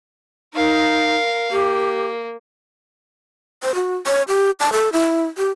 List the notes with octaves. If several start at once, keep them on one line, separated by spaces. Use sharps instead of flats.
D#4 A#4 F5
A#3 G4
C5
F#4
C#5
G4
A5
A4
E4
G4